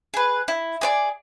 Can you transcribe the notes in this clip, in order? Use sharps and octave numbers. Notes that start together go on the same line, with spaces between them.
G#4 B4
E4
G#4 B4 D5